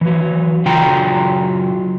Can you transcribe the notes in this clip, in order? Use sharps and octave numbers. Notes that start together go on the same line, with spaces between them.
E3 F#3
C#3 F#3 F4 G5 A#5